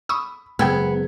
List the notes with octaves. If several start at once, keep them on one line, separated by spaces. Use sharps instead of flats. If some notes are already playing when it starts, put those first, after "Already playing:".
B5 C#6 D#6 E6
F#1 G#3 B3 G#4 G5 E6 G#6